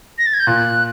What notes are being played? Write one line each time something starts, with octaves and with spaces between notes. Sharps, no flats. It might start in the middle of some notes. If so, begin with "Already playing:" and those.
A#6
A6
G#6
G6
A#2 F#6